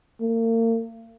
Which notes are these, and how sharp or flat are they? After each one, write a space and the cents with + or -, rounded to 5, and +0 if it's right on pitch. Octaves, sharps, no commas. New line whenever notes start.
A#3 -40